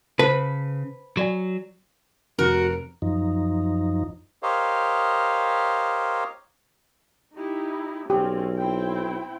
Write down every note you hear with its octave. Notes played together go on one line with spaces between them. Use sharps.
C#3 B4 C5 A5
F#3 F#4 D5 G#5
F1 F#4 A#4
F#2 F3 D#4
G4 A#4 C5 C#5 D#5 F5
D#4 E4 G4
B1 C4 C#4 G4
C4 E4 G5